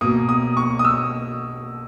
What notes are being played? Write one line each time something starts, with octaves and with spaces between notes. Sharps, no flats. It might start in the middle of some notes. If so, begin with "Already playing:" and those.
B2 A#3 D#6
D#6
C#6
D#6
E6